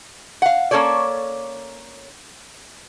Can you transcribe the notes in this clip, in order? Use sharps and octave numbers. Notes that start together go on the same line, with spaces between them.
F5 F#5
A#3 C#4 A4 C#5 D5